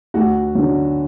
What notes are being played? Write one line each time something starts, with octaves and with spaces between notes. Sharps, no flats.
D2 F#4
D3 F#3